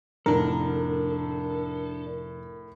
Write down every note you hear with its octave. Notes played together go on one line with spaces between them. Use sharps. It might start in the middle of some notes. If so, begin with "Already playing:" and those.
F1 A2 D4 A4 A#4